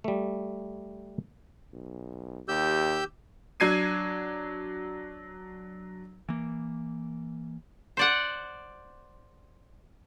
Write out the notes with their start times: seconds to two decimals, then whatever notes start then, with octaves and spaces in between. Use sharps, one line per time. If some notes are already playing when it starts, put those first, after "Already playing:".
0.04 G3 A3
1.73 B1
2.48 D#2 G4 E6 G6
3.60 F#3 D4 G#6 C7 D#7
6.29 E3 A#3
7.97 C5 D5 F#5